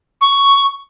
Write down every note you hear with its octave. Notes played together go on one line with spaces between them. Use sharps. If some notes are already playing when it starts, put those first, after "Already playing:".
C#6